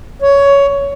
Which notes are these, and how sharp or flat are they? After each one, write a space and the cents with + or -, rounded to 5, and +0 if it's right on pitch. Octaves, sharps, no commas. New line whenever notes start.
C#5 +15